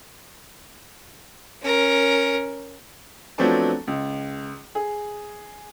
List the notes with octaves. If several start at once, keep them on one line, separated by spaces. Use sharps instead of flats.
C#4 A#4
F3 F#3 A3 B3 C4 D4
C#2
G#4